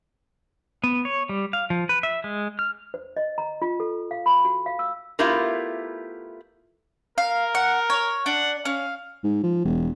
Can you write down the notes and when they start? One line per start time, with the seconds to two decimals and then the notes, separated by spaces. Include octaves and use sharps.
0.84 B3
1.05 C#5
1.29 G3
1.53 F5
1.70 F3
1.89 B4
2.03 E5
2.24 G#3
2.59 F6
2.94 C5
3.17 D#5
3.38 A#5
3.62 F4
3.80 A4
4.11 F5
4.26 B5
4.45 F#4
4.66 F5
4.79 E6
5.19 A3 B3 E4 F4 G4 A#4
7.18 A#4 F5
7.55 F#5
7.90 C#5
8.26 D4 F#5
8.65 C#4 F5
9.24 G#2
9.43 F3
9.65 E1